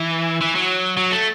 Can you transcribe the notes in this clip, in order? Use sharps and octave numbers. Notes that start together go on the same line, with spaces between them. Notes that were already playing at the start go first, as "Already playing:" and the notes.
Already playing: E3
E3
F#3
F#3
A3